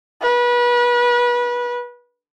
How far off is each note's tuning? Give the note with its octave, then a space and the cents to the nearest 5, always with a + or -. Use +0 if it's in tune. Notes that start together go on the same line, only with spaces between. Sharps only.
B4 -30